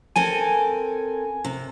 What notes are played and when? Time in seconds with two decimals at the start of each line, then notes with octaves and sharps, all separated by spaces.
0.16 C4 A4 A#4 G#5
1.44 C3